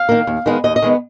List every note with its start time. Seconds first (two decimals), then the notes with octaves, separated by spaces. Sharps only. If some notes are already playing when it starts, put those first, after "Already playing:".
Already playing: F5
0.09 D#3 A#3
0.27 D#2
0.46 D#3 G#3 B3
0.64 D#2 D#5
0.76 D#5
0.82 D#3 G#3 B3